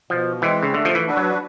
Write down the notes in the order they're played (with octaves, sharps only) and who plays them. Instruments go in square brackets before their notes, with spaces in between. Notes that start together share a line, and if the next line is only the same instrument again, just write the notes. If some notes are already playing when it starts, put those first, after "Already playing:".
[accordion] B2 [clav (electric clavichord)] F3
[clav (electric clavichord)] E3 [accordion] G#3 C4
[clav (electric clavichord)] C#3
[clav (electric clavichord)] D3 [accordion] A3
[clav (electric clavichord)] F3
E3
[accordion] D4 F#4 B4
[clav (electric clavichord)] F#3